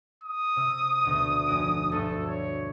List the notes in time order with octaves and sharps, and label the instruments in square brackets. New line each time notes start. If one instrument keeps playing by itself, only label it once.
[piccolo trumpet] D#6
[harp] C3 E6
D2 B2
F1 F#4 D7
[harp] D2 G2 [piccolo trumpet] A4
[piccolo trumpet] C#5